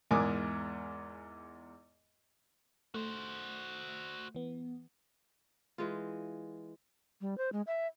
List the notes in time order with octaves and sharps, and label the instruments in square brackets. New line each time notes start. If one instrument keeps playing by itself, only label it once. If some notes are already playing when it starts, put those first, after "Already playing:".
[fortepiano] E2 G#2 A#4 G#5 D6 D#6
[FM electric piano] A3 [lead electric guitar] F#4 C5
[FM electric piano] E3 B3
[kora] E3 G#3 F4
[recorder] G3
C5
G#3
E5